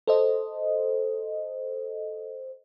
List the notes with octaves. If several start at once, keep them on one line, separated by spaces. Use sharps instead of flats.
A4 C5 D#5